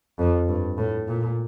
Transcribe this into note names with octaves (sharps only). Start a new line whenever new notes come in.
F2
G2
A2
A#2